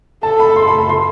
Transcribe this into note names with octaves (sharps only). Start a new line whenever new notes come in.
A4 A5
B5
C6
B5
B5
C6